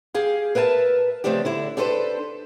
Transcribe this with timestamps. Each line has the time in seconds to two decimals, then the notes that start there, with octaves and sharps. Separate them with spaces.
0.14 G4 G#4 F5
0.55 A#4 B4 E5 G#5 A5
1.24 C#3 F3 A3 C4 D4 G4
1.45 D3 E4 E5
1.77 D4 G4 A4 B4 C5